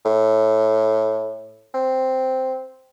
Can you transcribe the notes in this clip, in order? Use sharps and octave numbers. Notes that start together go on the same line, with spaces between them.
A2
C4